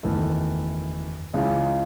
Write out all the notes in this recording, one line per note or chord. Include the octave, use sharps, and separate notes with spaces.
F#1 E2 D#3 A3 E4
C#2 C#3 E3 G#3